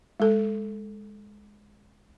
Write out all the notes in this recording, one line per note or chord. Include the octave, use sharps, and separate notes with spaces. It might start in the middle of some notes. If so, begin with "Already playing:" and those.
G#3 A4